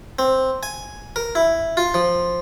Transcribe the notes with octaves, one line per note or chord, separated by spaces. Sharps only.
C4
G#5
A#4
E4
F4
F3